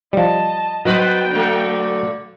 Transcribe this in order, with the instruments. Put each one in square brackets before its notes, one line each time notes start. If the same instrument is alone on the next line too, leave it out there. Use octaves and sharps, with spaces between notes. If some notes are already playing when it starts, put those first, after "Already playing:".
[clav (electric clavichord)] F3 G3 [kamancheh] D#5 A5
[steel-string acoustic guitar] F#3 C5 [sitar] B3 B4 D#5 [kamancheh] G5
[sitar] D3 A3